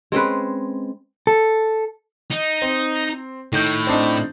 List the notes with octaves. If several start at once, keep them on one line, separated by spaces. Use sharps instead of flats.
G#3 C4 C#4 B4
A4
D#4
C4
A2 D#3 G6
C4 D4 D#4